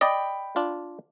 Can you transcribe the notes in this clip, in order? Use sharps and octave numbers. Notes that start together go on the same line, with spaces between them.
D5 D#5 G5 B5
D4 F4